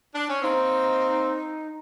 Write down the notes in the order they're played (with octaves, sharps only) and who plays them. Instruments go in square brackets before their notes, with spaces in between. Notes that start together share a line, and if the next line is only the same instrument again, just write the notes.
[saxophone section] D4
C#4
[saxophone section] A#3 C4 [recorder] D#4